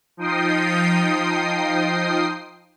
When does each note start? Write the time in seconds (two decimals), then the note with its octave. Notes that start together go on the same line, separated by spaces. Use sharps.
0.17 F3 D#4 G5 D#6 C7